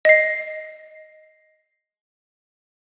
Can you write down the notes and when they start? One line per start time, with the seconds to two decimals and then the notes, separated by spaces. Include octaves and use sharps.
0.05 D#5 C7